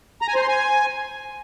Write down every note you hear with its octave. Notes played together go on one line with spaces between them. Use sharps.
A#5
G#5
C5
C6
G#5